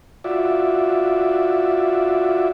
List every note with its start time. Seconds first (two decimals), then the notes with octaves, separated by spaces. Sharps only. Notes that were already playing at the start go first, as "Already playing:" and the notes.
0.24 F4 F#4 D5 E5